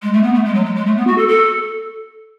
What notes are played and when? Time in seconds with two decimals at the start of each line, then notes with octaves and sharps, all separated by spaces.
0.03 G#3
0.13 A3
0.23 B3
0.34 A3
0.45 G#3
0.55 F#3
0.65 G#3
0.76 G#3
0.86 A3
0.97 B3
1.07 F#4
1.18 A4
1.28 A4